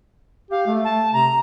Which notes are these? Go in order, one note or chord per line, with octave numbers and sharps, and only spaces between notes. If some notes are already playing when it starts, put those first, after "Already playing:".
G4 F5
A3
A5
C3 A#5